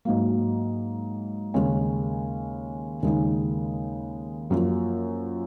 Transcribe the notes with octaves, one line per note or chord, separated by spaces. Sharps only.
G#2 F#3 A#3
D#2 C#3 G#3 C#4
D#2 C#3 G#3 D#4
F#2 F3 A#3 F4